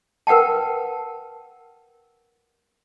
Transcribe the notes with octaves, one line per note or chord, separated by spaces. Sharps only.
A#4 B4 F#5 G5 A5